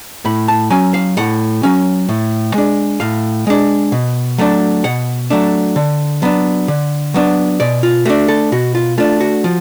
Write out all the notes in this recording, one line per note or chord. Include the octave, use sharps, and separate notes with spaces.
A2 B5
A5
F#3 C#4 G#5
F5
A2 F#5
F#3 C#4
A2
G#3 D4
A2 F5
G#3 D4
B2
F#3 A3 D4
B2 F#5
F#3 A3 D4
D3
F#3 B3 D4
D3
F#3 B3 D4
B2 D5
F4
A3 D4 F#4
A4
B2 F#4
F4
A3 D4 F4
F#4
F3